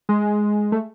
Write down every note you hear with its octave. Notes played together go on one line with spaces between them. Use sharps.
G#3
A3